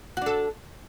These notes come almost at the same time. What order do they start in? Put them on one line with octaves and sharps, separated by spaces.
F#4 D4 A4